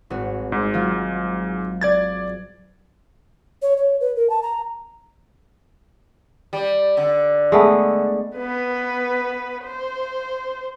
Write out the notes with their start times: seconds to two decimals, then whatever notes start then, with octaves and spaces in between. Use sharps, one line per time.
0.10 G#1 F#4
0.52 G#2
0.74 F#3 G#3 F4
1.81 D5 G#6 A6
3.62 C#5
3.77 C#5
4.01 B4
4.16 A#4
4.30 A5
4.43 A#5
6.53 G3
6.97 D3
7.52 G#3 A3 B3
8.37 B3 B4
9.64 C5